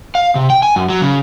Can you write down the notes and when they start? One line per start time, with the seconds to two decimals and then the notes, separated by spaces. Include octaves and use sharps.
0.15 F5
0.35 C3
0.50 G5
0.63 G#5
0.76 F#2
0.89 F#3
1.01 C#3